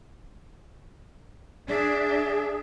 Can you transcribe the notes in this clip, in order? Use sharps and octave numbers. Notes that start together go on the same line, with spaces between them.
D4 G#4 E5